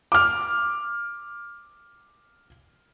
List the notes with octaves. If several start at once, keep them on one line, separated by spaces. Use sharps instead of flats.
D6 F6